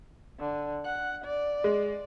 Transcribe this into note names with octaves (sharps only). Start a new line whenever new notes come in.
D3
F#5
D5
G#3